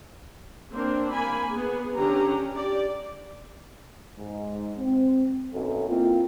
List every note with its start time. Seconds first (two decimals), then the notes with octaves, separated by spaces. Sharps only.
0.71 A#3 C4 D4 C5
1.12 A#3 G#5 B5
1.50 B3 G#4
1.95 D3 C#4 D4 G4 A#5
2.55 G4 D5
4.19 G#2
4.78 C4
5.54 B1 F#2 A4
5.89 A#3 C4 E4 F4